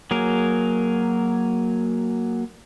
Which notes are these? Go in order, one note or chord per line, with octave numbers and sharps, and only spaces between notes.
F#3 A#3 G#4 A#4